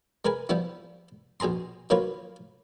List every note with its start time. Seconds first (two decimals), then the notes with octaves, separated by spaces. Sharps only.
0.25 G#3 A#4 B4 G#5
0.49 F3 G3 B3 E4
1.40 A#1 B2 G#4 A#5 C6
1.90 D#3 F#3 A#3 F4 B4 C#5